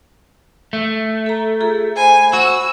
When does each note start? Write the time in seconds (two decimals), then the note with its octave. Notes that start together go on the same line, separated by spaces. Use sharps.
0.73 A3
1.26 A4 A#5
1.60 F4 G#4 A4
1.97 C5 G#5 B5
2.33 F#4 E6